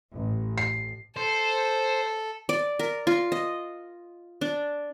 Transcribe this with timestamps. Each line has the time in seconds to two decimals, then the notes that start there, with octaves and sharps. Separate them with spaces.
0.14 A1
0.58 C7
1.17 A4 C5
2.49 D5
2.79 A#4
3.07 F4
3.32 D#5
4.41 D4